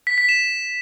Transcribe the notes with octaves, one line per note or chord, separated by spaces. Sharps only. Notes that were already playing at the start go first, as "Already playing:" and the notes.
B6
B6
E7